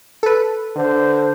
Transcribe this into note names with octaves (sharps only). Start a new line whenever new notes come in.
A4 B4
D3 C5